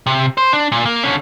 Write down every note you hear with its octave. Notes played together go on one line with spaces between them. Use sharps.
C3
C5
D4
A#2
A#3
D3 C#4